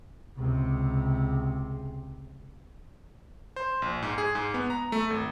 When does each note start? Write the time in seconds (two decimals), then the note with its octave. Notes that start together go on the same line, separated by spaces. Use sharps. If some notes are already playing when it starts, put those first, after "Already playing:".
0.38 C#2 C3
3.56 C5
3.82 A#1
4.03 G#2
4.18 G#4
4.35 G#2
4.54 B3
4.70 A#5
4.92 A3
5.10 G#1